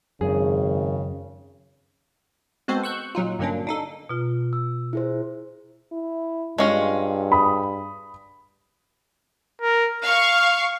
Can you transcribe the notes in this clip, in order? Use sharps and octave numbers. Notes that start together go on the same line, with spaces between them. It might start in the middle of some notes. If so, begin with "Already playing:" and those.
G#1 F#2 C#3 G#4
G#3 B3 C4 F#4 A4 C5
C#6 E6 F#6 G6
A#2 F#3 D#4 F4
G2 D3 F#3 A#3 C#4 D4
D4 D#4 A4
B2 F4
E6
E4 G#4 C5
E4
G2 G#3 C#4 F4
B5 D#6
A#4
F5 C#6 F6